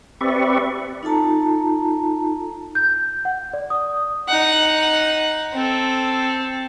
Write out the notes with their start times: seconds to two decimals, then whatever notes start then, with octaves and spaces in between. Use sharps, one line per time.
0.21 C4 G4 B4 D5 E5 C#6
1.03 D#4 F4 A4 A5 A#5
2.75 G6
3.25 F#5
3.53 D5
3.70 D#6
4.28 D#4 F#5
5.53 C4 A4